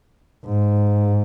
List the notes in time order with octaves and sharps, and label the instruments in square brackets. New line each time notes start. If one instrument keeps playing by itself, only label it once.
[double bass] G#2